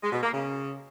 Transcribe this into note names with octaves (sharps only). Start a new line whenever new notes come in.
G#3
B2
A#3
C#3